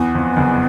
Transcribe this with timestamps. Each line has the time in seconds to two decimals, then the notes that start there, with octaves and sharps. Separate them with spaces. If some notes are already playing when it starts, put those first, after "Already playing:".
Already playing: E2 B3
0.15 F2
0.37 F#1 F#2